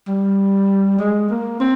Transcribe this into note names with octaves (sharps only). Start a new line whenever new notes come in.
G3
G#3
A#3
C4